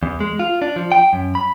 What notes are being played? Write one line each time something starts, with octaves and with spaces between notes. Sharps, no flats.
E2
G#3
F4
D4
F3
G5
F#2
B5